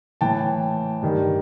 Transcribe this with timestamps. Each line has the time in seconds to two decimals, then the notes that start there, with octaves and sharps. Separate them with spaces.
0.21 A2 E3 G5 A5
1.02 G2 D#3